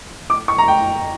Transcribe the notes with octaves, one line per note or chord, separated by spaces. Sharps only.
D6
C#6
A#5
G5